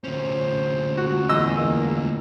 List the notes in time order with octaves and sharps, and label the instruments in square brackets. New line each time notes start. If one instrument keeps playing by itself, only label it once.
[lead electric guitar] D2 C#4 [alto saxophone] C5
[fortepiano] F#4
[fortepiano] E2 E6 [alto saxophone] D#5
[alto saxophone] A#3